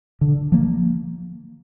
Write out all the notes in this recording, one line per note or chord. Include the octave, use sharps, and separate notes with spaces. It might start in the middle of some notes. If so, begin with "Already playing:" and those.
D3
F3 A#3